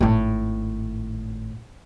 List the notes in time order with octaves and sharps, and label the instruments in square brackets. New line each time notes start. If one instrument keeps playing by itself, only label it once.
[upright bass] G#1 A2